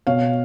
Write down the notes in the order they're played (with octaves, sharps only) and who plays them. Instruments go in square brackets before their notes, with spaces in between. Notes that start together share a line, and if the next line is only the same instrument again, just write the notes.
[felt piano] B2 C#5 F5